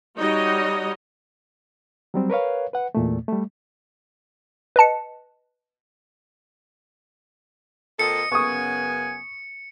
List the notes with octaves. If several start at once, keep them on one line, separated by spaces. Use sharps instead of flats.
G3 D#4 F#4 C#5 D#5
F#3 G3 C4
A#4 B4 C#5 F5
B4 F#5
E2 A#2 A3
G3 A3
B4 D#5 A5 C#7
A#2 C4 A4 D#5 C#7
F#2 C#3 B3 G#5 C#6 D#6